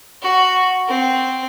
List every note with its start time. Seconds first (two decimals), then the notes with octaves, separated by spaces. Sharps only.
0.22 F#4
0.88 C4